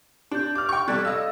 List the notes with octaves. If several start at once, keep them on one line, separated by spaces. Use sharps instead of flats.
D4 G4 G6
D6 F6
G5 C#6
G3 A4 D5 F#6 G#6
A4 D#5 F5 E6